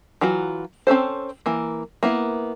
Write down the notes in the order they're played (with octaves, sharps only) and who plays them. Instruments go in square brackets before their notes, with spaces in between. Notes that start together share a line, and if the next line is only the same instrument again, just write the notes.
[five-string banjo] E3 F#3 F4 F#4
C4 C#4 A4 C5
E3 A#3
A#3 B3 E4